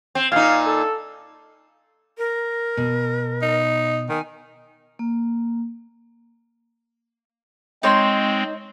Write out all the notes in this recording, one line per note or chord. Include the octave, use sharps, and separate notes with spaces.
C4
A#2 D#4 F5
A4
A#4
B2
D#4
D#3 G#5
A#3
G#3 C4 D#4 C#5 C6